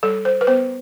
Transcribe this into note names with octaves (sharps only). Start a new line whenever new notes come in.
G3 A4
C5
B4
B3 C5